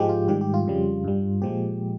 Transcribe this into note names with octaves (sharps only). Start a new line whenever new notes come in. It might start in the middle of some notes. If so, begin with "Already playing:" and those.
Already playing: G#2 F3 G#3 G4
F4
G#2 D#3 G3 G4
G4
F4
F2 C#3 G3
G2 G3
A#2 F3 G#3 G4